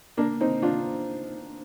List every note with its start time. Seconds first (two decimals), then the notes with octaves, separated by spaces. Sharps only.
0.17 A#3 D4
0.40 C4 D#4
0.62 D4 F4